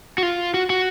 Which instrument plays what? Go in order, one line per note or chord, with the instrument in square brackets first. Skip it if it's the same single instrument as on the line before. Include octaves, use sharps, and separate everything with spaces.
[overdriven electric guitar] F#4
F4
F#4
F#4